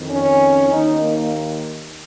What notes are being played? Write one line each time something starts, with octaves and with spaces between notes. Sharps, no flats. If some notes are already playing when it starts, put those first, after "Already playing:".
Already playing: F2 D#3
C#4
D#2 D#3 D#4
A#3